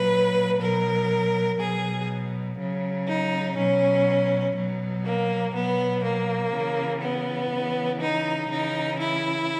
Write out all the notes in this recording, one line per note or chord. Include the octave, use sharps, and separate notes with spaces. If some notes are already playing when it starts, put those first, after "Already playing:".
Already playing: A#2 F#3 B4
B2 F#3 A#4
B2 F#3 G#4
C#3 F#3
D#4
B2 F#3 C#4
B2 F#3
A#3
B2 F#3 B3
A#3
C#3 E3
B3
C#3 E3
D#4
C#3 E3 D#4
E4